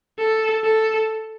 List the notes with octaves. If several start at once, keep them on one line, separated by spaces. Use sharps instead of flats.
A4
A4